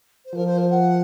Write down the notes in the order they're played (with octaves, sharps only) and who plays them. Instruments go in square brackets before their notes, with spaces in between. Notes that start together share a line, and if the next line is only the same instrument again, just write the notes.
[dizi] C5
[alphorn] F3 [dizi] A#4
[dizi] C5
A#4
F#5